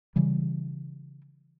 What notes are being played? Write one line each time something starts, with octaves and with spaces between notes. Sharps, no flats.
C#3 E3 G3